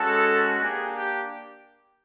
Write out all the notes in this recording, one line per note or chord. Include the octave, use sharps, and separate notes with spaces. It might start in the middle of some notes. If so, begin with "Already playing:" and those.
Already playing: G#3 C#4 F#4 A4
A#3 D4 G4 G#4
G4